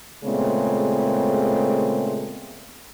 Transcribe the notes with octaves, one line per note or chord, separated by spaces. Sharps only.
A#2 C#3 G#3 A3 B3 C4